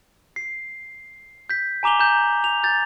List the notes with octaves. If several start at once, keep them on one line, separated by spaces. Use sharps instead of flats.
C7
G6 B6
G#5 A#5 D6 F7 G7
A#5 G6
F7
G6 A6